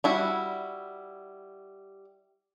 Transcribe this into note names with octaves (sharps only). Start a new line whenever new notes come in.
G3 E4 F#4